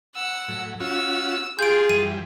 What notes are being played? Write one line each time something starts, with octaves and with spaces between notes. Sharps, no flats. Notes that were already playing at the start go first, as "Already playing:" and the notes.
F#5 E6
A2 F#3
C#4 F4 F#4 E6
F4 G4 G#4 F5 G#5 C6 G6 D7
F#2 E3 G3 D#7